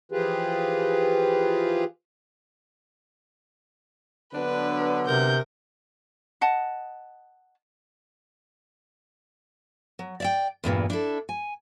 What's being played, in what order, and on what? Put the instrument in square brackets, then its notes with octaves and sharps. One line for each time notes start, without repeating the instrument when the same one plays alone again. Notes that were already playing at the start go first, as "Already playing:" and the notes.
[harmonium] E3 F3 F4 G4 G#4 B4
[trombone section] D3 F#3 B3 [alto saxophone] D4 [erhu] B4
[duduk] C3 [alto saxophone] A#4 [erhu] G6
[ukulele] D#5 F#5 A5
[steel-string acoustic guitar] F#3
D5 E5 G5
E2 G2 A#2 E3
D4 E4 A4
G#5